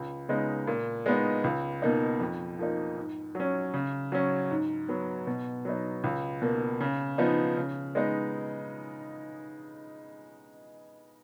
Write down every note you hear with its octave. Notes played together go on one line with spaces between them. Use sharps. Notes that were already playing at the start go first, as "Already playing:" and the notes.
Already playing: C#2
C#3 G#3 B3 D#4
A#2
G#3 B3 D#4
C#2
B2 A#3 D#4
F2
F3 A#3 D#4
G#2
F#3 C#4
C#3
F#3 C#4
G#2
F#3 B3
B2
F#3 B3 D#4
C#2
B2 A#3
C#3
F3 B3 D#4
C#3
G#3 B3 D#4